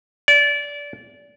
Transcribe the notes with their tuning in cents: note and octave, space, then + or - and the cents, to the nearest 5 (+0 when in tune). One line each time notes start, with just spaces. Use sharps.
D5 -25